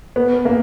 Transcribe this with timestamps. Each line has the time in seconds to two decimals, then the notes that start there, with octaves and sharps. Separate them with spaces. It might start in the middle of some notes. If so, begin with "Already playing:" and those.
0.16 B3
0.45 A#3